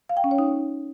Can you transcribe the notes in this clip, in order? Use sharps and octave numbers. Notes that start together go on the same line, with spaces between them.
F5
G5
C#4
C#5
D#4